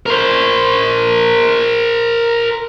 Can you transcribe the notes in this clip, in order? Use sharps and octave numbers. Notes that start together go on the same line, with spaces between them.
A#4 C5